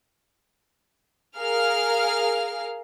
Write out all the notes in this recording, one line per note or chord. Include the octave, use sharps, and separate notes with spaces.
G#4 A#4 F5 F6